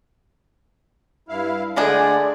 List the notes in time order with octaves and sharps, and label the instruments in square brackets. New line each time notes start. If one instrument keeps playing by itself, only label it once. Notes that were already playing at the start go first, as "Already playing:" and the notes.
[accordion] G2 E4 F5
[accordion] D3 A3 D5 [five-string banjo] G#3 D4 G#4